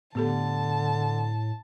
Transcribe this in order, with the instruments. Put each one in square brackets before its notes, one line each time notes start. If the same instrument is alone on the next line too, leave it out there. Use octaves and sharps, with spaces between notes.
[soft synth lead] A2 [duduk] D3 [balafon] B3 G4 A4 [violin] A5